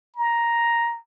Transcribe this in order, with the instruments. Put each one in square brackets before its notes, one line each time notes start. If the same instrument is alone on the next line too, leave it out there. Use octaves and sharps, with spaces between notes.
[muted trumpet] A#5